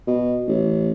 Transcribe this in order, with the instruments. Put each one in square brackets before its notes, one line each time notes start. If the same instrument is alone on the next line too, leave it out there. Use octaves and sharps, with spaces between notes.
[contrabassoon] B2
A1